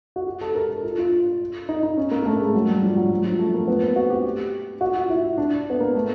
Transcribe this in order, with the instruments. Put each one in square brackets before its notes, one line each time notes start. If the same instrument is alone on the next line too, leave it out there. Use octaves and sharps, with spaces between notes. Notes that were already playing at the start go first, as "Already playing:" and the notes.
[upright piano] F#4
G4
A4
A#4
A4
F4
F4
D#4
D#4
C#4
A#3
A#3
A3
G#3
F#3
G3
F3
F#3
F#3
F3
A3
A#3
B3
C4
F#4
G4
F#4
F4
E4
D4
B3
A#3
A3